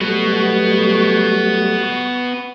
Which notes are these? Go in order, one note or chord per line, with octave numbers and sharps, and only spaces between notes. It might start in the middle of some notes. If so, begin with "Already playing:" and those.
F#3 G3 A3 B3 F#4